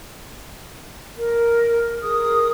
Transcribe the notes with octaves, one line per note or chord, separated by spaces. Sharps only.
A#4
G#4 A#4 D#6